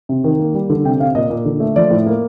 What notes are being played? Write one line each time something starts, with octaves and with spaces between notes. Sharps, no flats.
C3
D#3
A#3
G3
D3
C3 G5
C3 F5
A#2 D#5
A#2
D3
A3
F3 D5
A2
A#3